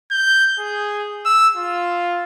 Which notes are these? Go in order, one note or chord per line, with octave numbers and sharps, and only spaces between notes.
G6
G#4
E6
F4